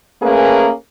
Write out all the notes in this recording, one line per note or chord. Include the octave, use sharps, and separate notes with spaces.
A3 A#3 C#4 G#4 A#4 B4